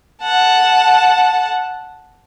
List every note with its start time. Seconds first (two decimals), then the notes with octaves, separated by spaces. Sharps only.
0.23 F#5 A5